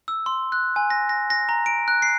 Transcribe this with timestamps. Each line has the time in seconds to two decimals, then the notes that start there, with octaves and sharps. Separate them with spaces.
0.08 E6
0.26 C6
0.52 F#6
0.76 G#5
0.90 A#6
1.09 A#6
1.30 A#6
1.49 A#5
1.66 D7
1.88 F#6
2.02 C7